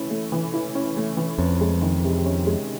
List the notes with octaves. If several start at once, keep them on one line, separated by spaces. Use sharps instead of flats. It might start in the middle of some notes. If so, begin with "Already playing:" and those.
Already playing: E3 A3 C#4 E4
A3
E3
E4
C#4
A3
E3
F2 C#4
G#3
D#3
C3
C#4
G#3